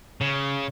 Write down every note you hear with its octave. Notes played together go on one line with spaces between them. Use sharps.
C#3